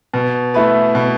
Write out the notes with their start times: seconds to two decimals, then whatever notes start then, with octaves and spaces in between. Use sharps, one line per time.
0.14 B2
0.54 A3 E4 B4
0.95 B2